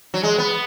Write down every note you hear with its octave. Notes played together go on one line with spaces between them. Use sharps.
F#3
G#3
B3